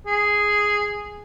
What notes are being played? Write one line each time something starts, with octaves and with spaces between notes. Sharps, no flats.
G#4